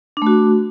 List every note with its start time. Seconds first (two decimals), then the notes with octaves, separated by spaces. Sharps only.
0.17 D4
0.22 A3
0.27 F#4